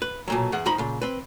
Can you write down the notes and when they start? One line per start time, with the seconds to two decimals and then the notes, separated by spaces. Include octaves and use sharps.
0.02 B4
0.28 B1 A#2 F#3
0.52 E2 E3 G#4 F#5
0.66 D#3 F3 D#4 A#5 B5
0.78 A#2 C#3
1.01 C4 B4